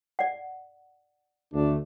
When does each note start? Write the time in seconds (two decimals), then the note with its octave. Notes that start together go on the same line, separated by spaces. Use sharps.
0.19 D5 F#5
1.53 D2 A3 D4